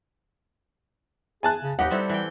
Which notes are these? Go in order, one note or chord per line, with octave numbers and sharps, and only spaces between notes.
G#4 G#5 A5 F#6
C#3
D#2 D#4 G4 B4 F#5
G3 C4 E4 A4
E3 G5